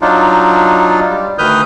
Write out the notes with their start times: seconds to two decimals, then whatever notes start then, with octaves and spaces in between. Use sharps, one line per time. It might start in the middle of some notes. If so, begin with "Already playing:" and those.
0.02 F#3 D4 D#4 F4
1.09 G3
1.38 D2 D#3 B4 D#6 F6 G6